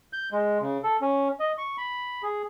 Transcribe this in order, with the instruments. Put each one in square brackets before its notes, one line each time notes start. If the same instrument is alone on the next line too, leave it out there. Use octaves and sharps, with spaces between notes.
[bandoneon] G6
G#3
C#3
A4
C#4
D#5
C#6
B5
G#4